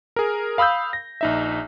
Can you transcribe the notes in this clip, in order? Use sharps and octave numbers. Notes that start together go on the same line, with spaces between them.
G#4 A#4
F5 B5 D#6 E6 G6
A#6
A#1 D#4 E5